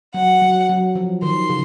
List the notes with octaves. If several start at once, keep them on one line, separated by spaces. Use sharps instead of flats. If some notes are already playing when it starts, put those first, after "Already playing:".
F#3 F#5
F#3
F#3
F3
D#3 C6
C#3